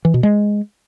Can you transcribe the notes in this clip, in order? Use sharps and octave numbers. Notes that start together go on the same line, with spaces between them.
E3
B2
G#3